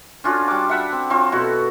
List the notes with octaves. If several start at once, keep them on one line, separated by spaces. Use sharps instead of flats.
C#4 D4 F4 F#4
G3 D6
E5 F#5 B5
C4
F#3 C4 F4 C#6
B2 E4 F#4 A4